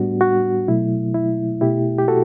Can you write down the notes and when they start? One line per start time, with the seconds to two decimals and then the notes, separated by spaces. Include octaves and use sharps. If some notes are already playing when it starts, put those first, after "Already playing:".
Already playing: A2 G3 B3 D4 F#4
0.21 F#4
0.68 B2 F#3 A3 E4
1.14 E4
1.61 B2 A3 E4 G4
1.98 G4
2.08 F#4 A4